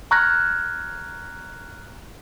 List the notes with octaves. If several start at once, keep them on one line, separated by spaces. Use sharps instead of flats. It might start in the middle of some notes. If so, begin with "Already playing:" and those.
A#5 C#6 F6 F#6 G#6 A#6